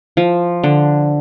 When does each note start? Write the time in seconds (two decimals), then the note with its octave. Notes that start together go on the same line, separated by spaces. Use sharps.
0.17 F3
0.64 D3